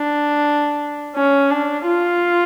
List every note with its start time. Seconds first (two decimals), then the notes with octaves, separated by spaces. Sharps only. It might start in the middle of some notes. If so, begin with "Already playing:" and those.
Already playing: D4
1.15 C#4
1.51 D4
1.87 F4